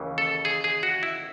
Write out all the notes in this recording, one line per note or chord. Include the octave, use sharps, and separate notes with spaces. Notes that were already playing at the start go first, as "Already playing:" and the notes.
Already playing: D#2 C#3 E3
A4
G#4
G#4
F#4
E4